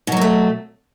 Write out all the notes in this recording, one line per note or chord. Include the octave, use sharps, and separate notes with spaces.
B2 F#3 A3 A#3